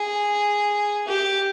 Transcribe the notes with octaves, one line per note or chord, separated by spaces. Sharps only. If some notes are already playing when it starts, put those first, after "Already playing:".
Already playing: G#4
G4